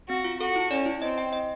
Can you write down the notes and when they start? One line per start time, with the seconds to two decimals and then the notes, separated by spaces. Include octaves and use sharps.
0.09 C4 F#4
0.25 F4
0.39 F#4 A4
0.56 E4
0.71 C#4 D5
0.86 E4
1.02 C4 D#5
1.18 G5
1.33 D#5